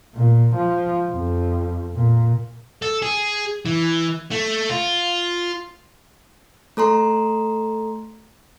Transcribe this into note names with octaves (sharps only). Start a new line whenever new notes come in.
A#2
F3
F2
A#2
A4
G#4
E3
A3
F4
A3 A4 A#5 C6